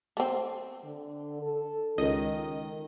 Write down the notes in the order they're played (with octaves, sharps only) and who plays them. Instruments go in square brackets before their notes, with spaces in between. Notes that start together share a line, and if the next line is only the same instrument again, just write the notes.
[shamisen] A3 C4
[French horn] D3
A4
[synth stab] C#2 D#5 [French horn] D#3